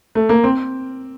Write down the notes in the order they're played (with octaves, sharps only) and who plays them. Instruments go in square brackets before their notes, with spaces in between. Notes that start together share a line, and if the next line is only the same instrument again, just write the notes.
[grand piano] A3
A#3
C4